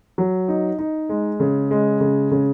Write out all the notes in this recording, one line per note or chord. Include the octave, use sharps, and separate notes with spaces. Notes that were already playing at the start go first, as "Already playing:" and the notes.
F#3
D#4
D#4
G#3
C#3
G#3
C#3
C#3